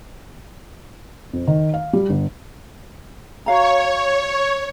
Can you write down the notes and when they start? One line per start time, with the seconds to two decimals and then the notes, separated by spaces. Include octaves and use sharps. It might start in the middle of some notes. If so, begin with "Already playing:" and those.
1.33 F2
1.47 D#3
1.74 F5
1.93 G3
2.10 G1
3.46 F#4 C#5 F5 A#5